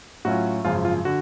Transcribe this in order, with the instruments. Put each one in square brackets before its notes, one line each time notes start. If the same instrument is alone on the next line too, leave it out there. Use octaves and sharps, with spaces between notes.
[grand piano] A2 F#3 C#4 F4 [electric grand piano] F#4
[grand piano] G#1 F#2 C#3 F3 [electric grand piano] F4
[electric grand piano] F4
[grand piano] D3 [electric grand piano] F#4